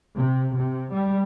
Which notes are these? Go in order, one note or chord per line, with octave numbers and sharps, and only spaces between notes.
C3
C3
G3